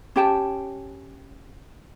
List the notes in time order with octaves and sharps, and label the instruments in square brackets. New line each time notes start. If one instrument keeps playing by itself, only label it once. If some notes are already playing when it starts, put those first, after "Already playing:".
[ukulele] C#4 G4 G5 A5